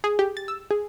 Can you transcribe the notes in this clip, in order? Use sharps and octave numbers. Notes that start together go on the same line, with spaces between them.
G#4
G4
A6
E6
G#4